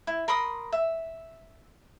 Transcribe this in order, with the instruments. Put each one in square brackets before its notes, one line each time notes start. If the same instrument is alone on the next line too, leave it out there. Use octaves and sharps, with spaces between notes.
[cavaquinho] E4
A#4 B5 C6 D#6
E5